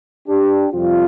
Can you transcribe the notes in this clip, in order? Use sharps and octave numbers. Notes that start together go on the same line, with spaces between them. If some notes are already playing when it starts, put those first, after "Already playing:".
D4 G4
F2 C3 G3 C4 F4